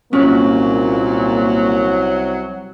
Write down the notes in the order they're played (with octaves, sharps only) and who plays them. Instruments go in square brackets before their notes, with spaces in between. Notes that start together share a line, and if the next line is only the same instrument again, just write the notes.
[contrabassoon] C2 [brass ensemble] A#2 A#3 [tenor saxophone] F#3 [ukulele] C#4